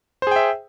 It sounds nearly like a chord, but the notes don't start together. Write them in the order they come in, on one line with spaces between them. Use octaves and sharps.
C5 G#4 G5 E5